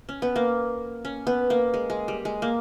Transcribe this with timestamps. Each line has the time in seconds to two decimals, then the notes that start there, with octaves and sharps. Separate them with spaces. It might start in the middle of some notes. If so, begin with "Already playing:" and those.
0.09 C#4
0.22 B3
0.36 A#3
1.05 C#4
1.27 B3
1.50 A#3
1.74 G#3
1.90 G#3
2.08 G3
2.25 G#3
2.42 A#3